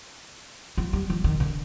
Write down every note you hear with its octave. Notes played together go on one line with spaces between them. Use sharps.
F3
G3
F3
D#3
D3